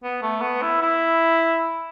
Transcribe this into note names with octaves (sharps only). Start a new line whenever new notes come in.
B3
A3
B3
E4
E4